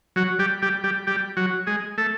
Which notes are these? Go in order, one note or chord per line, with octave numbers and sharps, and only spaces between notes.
F#3 F#4
G3 G4
G3 G4
G3 G4
G3 G4
F#3 F#4
G#3 G#4
A3 A4